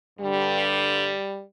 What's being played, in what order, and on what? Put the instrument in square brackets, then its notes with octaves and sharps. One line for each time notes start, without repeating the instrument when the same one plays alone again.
[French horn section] G2 D3 G3